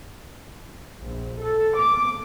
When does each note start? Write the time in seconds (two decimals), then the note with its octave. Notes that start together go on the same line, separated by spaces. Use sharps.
1.00 A#1
1.39 A4
1.77 D6